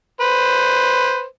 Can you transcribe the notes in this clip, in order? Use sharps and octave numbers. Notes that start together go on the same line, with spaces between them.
B4 C5